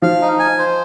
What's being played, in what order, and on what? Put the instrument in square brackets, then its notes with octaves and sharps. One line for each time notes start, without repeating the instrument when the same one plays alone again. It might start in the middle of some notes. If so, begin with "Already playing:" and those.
[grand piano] F3 [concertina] F5
[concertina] D#4
G#5
C5